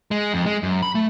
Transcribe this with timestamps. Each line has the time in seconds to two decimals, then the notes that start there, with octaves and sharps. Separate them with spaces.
0.11 G#3
0.34 F2
0.46 G#3
0.63 F#2
0.83 B5
0.95 A3